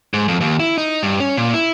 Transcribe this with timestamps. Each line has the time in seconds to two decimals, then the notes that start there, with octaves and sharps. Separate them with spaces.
0.14 G#2
0.28 F2
0.41 D#2
0.60 E4
0.78 D#4
1.03 G2
1.20 C#4
1.37 A#2
1.54 E4